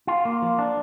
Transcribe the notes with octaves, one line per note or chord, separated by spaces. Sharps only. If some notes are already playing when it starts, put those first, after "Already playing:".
F4
A#3
F3
D4